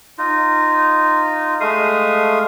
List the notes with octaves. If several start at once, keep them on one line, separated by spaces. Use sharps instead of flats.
D#4 F4
G#3 A3 F5 D#6